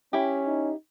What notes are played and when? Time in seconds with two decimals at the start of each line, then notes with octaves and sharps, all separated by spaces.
0.13 C#4 E4 G4
0.46 D#4